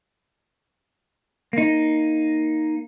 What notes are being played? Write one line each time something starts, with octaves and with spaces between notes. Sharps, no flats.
A#3 D#4